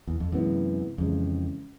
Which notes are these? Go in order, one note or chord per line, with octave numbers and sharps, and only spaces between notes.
E2
F2
F#2 C3 E3 G#3 B3 E4
F2 C#3 E3 G#3